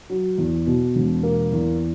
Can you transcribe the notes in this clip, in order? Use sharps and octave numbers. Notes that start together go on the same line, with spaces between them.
F#3
E2
B2
E1
A#3
E2